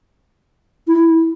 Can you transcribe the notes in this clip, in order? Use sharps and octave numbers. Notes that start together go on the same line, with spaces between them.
E4